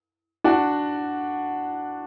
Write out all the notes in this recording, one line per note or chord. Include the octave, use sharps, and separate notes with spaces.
D4 F#4